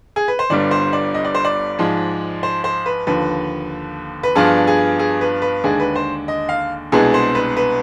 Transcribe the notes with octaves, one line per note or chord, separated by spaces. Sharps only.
G#4
B4
C5
G1 G2 D3 G3 B3 D5
C5
D5
D#5
D5
C5
D5
G#2 F3 G#3
C5
C5
B4
D#2 D3 F3 B4
B4
G2 F3 B3 D4 F4 G#4
G#4
G#4
B4
B4
D#2 D3 G#3 D4 G#4
B4
C5
D#5
F5
C2 B2 G#3 B3 D4 G#4
C5
B4
B4